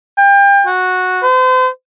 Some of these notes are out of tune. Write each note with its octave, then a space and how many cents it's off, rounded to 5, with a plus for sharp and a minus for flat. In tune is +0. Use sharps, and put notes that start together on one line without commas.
G5 +30
F#4 -10
C5 -40